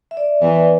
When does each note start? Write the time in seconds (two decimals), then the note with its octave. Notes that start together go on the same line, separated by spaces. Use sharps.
0.11 E5
0.17 D5
0.42 E2 E3 B4